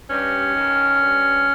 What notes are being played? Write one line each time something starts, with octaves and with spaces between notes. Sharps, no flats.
G2 C#4
D#3
G2